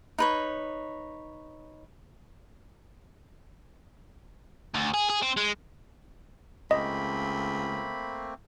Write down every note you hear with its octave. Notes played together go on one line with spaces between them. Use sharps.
D#4 B4 C#5
D2
G#4
G#4
C4
G#3
C#2 A3 A#3 C4 D#5 B5